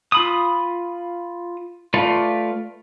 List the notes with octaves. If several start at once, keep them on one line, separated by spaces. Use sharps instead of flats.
F4 B5 D#6
A3 F4 B4 D5